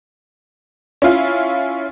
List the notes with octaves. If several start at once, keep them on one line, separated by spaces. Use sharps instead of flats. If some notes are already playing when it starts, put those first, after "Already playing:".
C#4 E4 F4